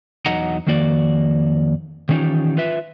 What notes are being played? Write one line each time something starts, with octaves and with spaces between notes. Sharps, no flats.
E2 F#3 D#4 D#5 F#5 A#5
F2 D#3 A#3 F#4 D5
D#3 E3 C#4 D#4 F4 G4
F4 B4 E5